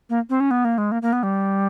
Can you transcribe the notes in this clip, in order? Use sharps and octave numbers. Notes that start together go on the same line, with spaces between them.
A#3
C4
C#4
B3
A#3
G#3
A#3
A#3
B3
G3